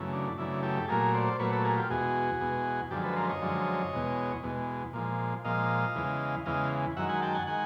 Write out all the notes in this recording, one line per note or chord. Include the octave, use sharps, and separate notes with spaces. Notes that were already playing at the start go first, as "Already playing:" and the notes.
Already playing: F#2 C#3 E3 A3
D4
F#2 C#3 E3 A3 D4 E4
G4 A4
A#2 F#3 A3 G#4 A#4
C5 D5
A#2 F#3 A3 B4 C#5
A4 B4
G#4 A#4
F4 G4
E2 B2 G#3 F#4 G#4
E2 B2 G#3
F#2 D3 F3 G#3 G4 A4
A4 B4
A#4 C5
C#5 D#5
F#2 D3 F3 G#3
E2 B2 G#3
E2 B2 G#3
A#2 F3 G#3
A#2 F3 G#3 D#5 F5
E2 C#3 E3 G#3
E2 C#3 E3 G#3 D#5 F5
F#2 D#3 G#3 E5 F#5
F#5 G#5
G5 A5
F#5 G#5
D#3 G#3 F#5 G#5